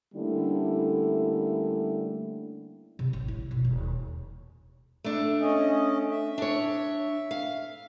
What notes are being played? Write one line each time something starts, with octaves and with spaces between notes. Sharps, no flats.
D3 G3 A3 A#3 C#4 E4
C3
A1
E4
B2
D#1
A3 D4
C#4 D#5
E5
D4 C#5
F5